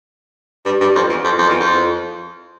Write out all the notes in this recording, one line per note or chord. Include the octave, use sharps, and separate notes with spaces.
G2
G2
F2
E2
F2
F2
E2
F2